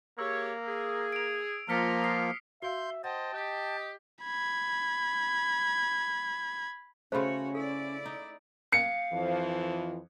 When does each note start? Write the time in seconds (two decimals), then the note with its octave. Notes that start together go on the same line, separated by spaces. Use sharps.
0.19 A#3 G4 G#4 C#5 E6
0.67 G#4
1.13 D7 F7
1.69 F3 A#3 F4 A#5 F6 B6 C#7
2.02 D#6 C7
2.62 F#4 E5 F5 C6 G6
3.04 C5 D#5 F#5 G5 A5
3.33 G4 D#5
4.24 B5 G#6
7.12 C#3 A3 C#4 F#4 C5 C#5 B5 C6
7.55 E4 A4 D5
8.06 D#4
8.72 F5 C#7
9.13 F2 E3 F3